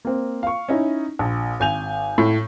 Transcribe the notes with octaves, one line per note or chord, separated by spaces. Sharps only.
A#3 C4
F5 C#6
C#4 D#4 E4
A#1
G#1 G#5 G6 F7
A2